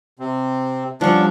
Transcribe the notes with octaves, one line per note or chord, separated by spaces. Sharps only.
C3 C4
F3 G3 B3 C#4 D4 C#6